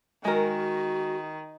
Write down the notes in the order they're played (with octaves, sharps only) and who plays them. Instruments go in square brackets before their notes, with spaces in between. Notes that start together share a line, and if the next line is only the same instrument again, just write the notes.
[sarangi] D#3 [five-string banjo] G#3 A#4 [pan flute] F#4